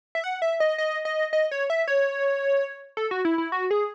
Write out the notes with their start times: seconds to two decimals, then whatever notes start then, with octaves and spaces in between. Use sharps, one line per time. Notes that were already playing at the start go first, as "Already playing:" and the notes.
0.15 E5
0.24 F#5
0.42 E5
0.60 D#5
0.78 D#5
1.05 D#5
1.33 D#5
1.51 C#5
1.70 E5
1.88 C#5
2.97 A4
3.11 F#4
3.25 E4
3.38 E4
3.52 F#4
3.71 G#4